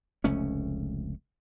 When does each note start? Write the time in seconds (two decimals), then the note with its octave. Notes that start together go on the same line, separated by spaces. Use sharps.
0.24 F1 C#2 A3 C#4